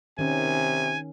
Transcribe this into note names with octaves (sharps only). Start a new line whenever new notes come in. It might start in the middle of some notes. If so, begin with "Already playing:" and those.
C3 D#3 C#4 G#5